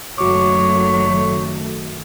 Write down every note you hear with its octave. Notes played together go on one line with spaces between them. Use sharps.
F#1 D#3 F#3 A3 F#4 C#5 D6